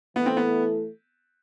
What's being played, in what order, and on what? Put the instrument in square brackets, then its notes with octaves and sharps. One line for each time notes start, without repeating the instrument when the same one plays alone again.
[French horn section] E3 A3 E4 A4 [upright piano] B3
[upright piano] C4
B3